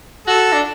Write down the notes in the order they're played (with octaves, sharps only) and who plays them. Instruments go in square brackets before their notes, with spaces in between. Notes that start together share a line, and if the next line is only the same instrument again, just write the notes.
[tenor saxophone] F#4 [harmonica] A4
[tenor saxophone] D4